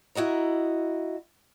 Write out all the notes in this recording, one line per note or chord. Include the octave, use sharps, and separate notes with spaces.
E4 F#4 D#5 A#5